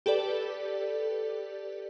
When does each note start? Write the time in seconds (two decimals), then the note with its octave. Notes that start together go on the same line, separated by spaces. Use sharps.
0.06 G4 A4 B4 D5